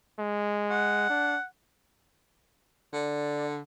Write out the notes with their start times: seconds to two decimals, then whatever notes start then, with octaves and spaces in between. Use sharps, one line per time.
0.19 G#3
0.71 F#5
1.10 D4
2.93 D3 D5